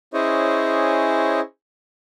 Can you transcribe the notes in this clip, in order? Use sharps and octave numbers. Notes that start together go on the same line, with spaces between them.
C#4 E4 G#4 C5 C#5 D#5